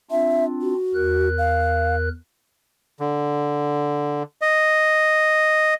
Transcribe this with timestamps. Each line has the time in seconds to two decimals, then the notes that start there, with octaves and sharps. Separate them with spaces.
0.11 C4 D4 F4 E5
0.62 F#4
0.94 E2 A#4 F#6
1.38 F5
3.00 D3
4.41 D#5